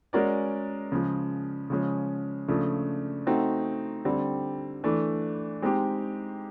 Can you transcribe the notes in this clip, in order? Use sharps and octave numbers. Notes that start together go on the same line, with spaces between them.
G#3 C#4 F#4 A#4 D5
C#3 F3 G#3
C#3 F3 G#3 C#4
C#3 F3 A3 D4
A3 C4 D#4 F#4
D3 G3 C4
E3 A3 D4
G#3 C4 D#4 G4